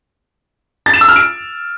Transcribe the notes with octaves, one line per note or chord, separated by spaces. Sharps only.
A6
E7
E6
F6
D7